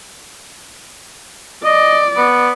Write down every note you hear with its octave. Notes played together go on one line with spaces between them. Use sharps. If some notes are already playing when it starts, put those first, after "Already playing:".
D5 D#5
B3